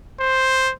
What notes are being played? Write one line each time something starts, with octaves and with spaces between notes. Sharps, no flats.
C5